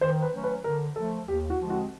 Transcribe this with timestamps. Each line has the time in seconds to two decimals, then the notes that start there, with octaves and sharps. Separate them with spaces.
0.01 D#3 C5
0.23 B4
0.33 F#3 A3 C#4
0.44 B4
0.64 D3 A#4
0.96 F3 A3 A4
1.28 D#2 G4
1.50 F#4
1.60 D3 F3 G#3 C4
1.70 F#4